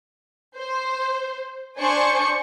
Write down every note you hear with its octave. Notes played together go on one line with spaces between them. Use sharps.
C5
D4 C5 D5 G#5 C#6 C#7